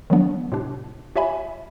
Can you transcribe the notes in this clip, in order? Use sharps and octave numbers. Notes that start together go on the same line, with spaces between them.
D#3 F#3 G3 B3 D4
A2 C3 D4
F4 G4 C#5 E5 G#5 B5